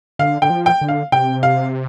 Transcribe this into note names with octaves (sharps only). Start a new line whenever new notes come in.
D3 F5
D3 G5
F3
G5
D3
F5
C3 G5
F5